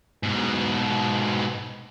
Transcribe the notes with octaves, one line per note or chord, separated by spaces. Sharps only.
G#2 B2